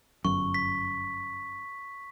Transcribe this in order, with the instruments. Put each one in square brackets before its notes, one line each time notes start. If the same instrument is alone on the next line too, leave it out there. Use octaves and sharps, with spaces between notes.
[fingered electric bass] G1 F#2 [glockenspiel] C#6
[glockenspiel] B6